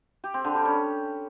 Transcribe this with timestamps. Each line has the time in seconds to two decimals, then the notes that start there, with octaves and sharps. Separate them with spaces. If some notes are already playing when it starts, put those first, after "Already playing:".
0.24 G4
0.34 C4
0.45 D3
0.55 G3
0.65 C#4